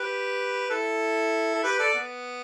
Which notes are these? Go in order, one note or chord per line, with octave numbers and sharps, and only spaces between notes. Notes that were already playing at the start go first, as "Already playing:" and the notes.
Already playing: G4 B4
E4 A4
A4
G4 B4
A4 D5
B3